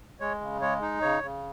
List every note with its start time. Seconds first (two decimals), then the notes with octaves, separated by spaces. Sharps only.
0.20 G#3 C#5
0.41 C#3
0.61 G#3 C#5
0.82 D#4
1.02 C#3 C#5
1.23 C#3